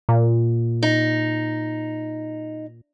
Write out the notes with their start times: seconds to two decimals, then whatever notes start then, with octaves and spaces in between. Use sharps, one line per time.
0.09 A#2
0.83 D#4